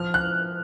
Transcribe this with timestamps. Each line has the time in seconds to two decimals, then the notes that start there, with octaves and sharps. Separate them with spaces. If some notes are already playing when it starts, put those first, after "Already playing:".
Already playing: F3 F6
0.14 F#6